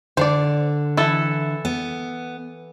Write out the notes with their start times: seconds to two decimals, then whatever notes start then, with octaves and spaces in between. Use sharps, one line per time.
0.17 D3 C5 D5
0.97 E3 E4 A4
1.65 B3